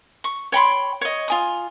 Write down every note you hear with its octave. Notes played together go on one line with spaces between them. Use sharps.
C#6
C#5 G5 B5 C6
C#5 D#5
F4 G#5 D#6